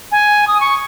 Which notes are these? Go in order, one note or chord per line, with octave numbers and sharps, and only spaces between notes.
G#5
D#6
C#6